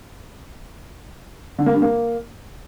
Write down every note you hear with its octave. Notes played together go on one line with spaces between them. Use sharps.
D3
A#3
G2
A#3